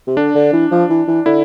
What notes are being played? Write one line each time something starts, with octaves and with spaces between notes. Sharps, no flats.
C3
D3 D4
D3
E3
F3
E3
E3
D3 E4